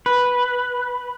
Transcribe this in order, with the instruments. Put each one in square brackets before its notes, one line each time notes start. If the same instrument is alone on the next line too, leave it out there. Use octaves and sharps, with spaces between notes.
[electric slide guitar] B4